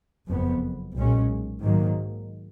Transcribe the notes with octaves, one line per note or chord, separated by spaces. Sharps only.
F#1 F2 F3 B3
B1 A#2 G#3 C#4
G#2 D#3 F#3 A#3